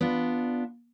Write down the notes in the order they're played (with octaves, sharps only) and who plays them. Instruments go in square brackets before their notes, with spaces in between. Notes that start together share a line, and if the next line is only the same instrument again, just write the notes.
[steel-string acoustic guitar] B3 D4 F4